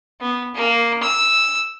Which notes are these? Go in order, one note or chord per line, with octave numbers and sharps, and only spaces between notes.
B3
A#3
E6